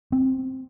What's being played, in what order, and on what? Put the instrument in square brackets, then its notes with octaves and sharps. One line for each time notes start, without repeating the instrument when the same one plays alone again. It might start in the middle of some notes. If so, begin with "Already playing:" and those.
[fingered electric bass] C4